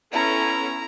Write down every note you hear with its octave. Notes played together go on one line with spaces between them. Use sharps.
B3 C#4 E4 A4 A#5